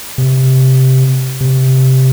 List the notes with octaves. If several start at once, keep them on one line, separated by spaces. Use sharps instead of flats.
C3
C3